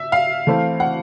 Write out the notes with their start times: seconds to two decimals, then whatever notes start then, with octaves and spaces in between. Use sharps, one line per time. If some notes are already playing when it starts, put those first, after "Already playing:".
Already playing: E5
0.12 F5
0.47 E3 A3 C4
0.80 F#5